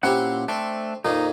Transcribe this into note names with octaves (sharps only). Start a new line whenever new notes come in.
A#2 C4 C#4 E4 G4 F#5
A3 C4 D4
F2 A#2 D#3 D#4